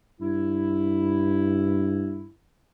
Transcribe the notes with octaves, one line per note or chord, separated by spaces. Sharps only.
G2 E4